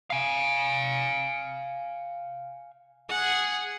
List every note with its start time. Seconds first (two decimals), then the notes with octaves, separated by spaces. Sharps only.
0.10 F5 G#5
3.09 G#4 F#5